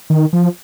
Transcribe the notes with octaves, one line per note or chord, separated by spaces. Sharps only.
D#3
F3